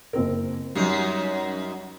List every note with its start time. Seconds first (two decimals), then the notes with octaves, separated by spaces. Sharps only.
0.13 F#1 C4 A#4
0.75 F#2 F#3 G3 D#4